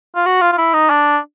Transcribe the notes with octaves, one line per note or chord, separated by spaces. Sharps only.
F4
F#4
F4
F4
E4
D#4
D4